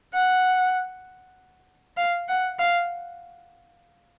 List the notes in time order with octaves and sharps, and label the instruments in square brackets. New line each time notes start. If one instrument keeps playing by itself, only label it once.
[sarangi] F#5
F5
F#5
F5